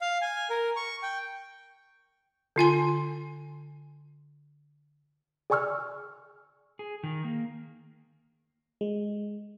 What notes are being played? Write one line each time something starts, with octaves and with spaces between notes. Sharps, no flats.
F5
G#5
A#4
C#6
G5
D3 F4 G#5 C6
G#4 D5 G#5 C#6 E6 F6
G#4
D#3
A#3
G#3